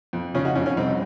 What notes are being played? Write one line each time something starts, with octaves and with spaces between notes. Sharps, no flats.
F2
C#3 C#4 F4
D#4 F#4
F2 C#4
C#4
C2 C4 D#4